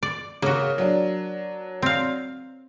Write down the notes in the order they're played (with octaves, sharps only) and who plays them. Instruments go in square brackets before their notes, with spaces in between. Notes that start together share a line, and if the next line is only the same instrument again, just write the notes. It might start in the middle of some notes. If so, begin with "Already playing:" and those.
[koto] D5
[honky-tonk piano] C#3 [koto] A#3 F#4
[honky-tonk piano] F#3 D4
[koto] C4 F5